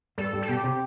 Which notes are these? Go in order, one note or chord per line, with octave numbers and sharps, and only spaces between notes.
G2 A4
G2
A4
B2 G4
C3